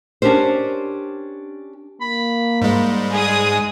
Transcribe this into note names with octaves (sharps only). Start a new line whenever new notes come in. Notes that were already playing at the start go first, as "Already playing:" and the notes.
C#4 D4 G4 A#4 C5
A#3 B5
G#2 G3 G#3
G#4 D#6